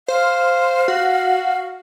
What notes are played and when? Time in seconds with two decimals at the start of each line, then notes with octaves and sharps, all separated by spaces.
0.08 C5 F5
0.88 F#4